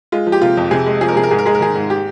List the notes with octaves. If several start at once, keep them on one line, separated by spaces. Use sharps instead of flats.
G#3 F4
F3
G4
C3 F4
F2
C3 G#4
G#3
F3 G#4
A#4
C3 G#4
A#4
G#2 G#4
A#4
G#3 G#4
A#4
D#3 G#4
G#2
G4